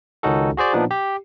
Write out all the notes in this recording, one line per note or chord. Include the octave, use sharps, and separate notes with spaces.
C#2 D#3 C#4 D#4 F#4 A4
F#4 G#4 C5 D5
A#2 F3 B3 D4 D#4
G4